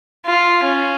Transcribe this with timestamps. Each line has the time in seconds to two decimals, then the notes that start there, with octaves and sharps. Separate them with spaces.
0.26 F4
0.65 C#4